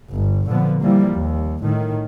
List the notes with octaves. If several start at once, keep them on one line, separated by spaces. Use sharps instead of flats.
G1
A#2 D3 F3 B3
E3 F3 G3 A#3
D#2
A2 D#3